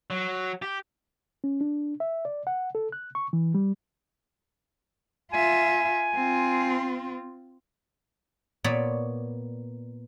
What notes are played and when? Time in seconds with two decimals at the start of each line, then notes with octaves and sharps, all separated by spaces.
0.10 F#3
0.62 G4
1.44 C#4
1.61 D4
2.00 E5
2.25 D5
2.47 F#5
2.75 A4
2.92 F#6
3.15 C#6
3.33 E3
3.55 G3
5.33 F4 E5 G#5
6.15 C4 F4
8.64 A#2 B3 C#5 D5